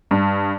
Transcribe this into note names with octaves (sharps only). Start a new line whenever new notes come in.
G2